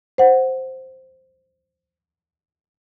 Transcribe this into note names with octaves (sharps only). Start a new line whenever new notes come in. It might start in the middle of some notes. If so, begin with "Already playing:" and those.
C5 F#5